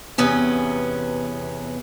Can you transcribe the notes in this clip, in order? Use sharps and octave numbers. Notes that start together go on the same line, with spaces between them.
E2 C3 B3 C#4